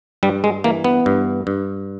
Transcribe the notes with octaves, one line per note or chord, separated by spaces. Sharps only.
G2 G3
G#3
E3 A#3
B3
G2
G2